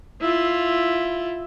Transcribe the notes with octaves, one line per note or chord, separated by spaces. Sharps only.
E4 F4